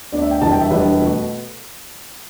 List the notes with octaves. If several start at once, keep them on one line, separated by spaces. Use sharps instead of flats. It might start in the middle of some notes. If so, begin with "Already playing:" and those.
D2 D3 B3 D4 D5
E5
G5
E1 E2 D3 G3 A5
G5
E5
E1 E2 D3 G3 B4
B2 A3